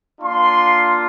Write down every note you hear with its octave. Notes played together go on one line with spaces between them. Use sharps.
A#3 D4 F4 C6